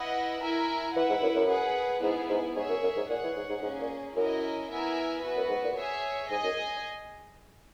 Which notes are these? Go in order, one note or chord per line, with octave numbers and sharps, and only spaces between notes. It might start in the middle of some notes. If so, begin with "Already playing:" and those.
Already playing: E4 B4 D#5 F#5
E4 A#4 E5 G#5
E3 E4 B4 F#5
G#2
F#2
F#2
G#4 B4 F#5
G#2 B3 E4 G#4
G#2
G#2 G#4 C#5 E5
F#2
F#2
G#2
A#2 G#4 C#5 F#5
E3
G#2
G#2
G#2 A#3 C#4 G#4
A#2
F#2 C#4 E4 A#4 D#5
B3 E4 A#4 E5 G#5
B3 F#4 B4
F#2
G#2
A#2
G#4 C#5 E5
G#2 G#4 D#5 G#5
F#2